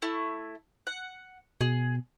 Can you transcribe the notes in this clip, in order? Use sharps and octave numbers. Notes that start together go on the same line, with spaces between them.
A3 E4
F#5
B2 G#4